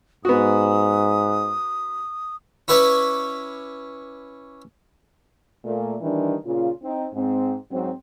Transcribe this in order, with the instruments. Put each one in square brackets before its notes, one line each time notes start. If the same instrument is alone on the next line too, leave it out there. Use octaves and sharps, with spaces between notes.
[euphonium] G#2 [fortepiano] B3 F#4 [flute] D#6
[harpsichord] C#4 E4 B4 C#5 D5
[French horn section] A#2 A3
D#3 E3 G3 D4
A#2 C#3 F4
C4 D#4
G#2 C4
G#2 F#3 C4